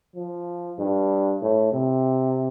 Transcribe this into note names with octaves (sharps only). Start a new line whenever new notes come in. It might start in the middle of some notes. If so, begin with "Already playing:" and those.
F3
G2
A2
C3